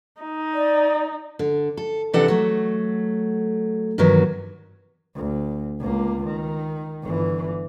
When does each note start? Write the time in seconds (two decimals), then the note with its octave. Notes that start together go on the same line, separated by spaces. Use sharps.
0.22 D#4
0.54 D5
1.39 D3
1.77 A4
2.13 C3 E3 D4 A4 D5 F#5
2.28 F#3 A3
3.98 G2 C3 D#3 E3 F#3 B3
5.15 D2
5.80 C#2 A#3
6.25 D#3
7.03 G1 E3